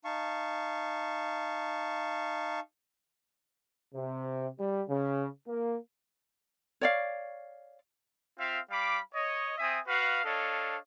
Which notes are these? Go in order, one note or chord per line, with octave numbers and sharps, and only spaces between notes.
D#4 F5 A5 C#6
C3
G3
C#3
A#3
C#5 D5 F5
C4 F4 E5 F5
G3 F5 B5 D6
C#5 D#5
C4 E5 G#5 D#6
F#4 B4 F5
D4 A4 C#5 D#5 F5